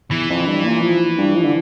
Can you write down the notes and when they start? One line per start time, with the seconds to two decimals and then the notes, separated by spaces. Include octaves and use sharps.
0.11 E2 E3
0.30 F2
0.46 G2
0.64 A#2
0.82 F3
1.18 G2
1.35 F3
1.44 D3